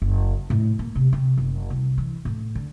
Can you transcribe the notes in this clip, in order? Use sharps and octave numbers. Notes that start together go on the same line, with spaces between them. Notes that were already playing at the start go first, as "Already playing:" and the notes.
F#1
A2
A#3
C3
C3
F#1
C2
E3
A2
D3